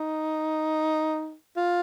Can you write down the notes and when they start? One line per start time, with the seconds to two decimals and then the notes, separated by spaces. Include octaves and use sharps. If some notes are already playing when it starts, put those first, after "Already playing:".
Already playing: D#4
1.57 F4